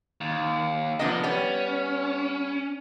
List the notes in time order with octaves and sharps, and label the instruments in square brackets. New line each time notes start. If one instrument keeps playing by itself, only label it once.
[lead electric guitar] D#2
[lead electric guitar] C3 F3 [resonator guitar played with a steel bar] B3 D4 D#5
[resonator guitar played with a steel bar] G3 B3 [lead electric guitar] C#4